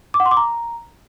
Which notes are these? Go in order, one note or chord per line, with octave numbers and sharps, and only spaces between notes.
D6
F#5
C6
D6
A#5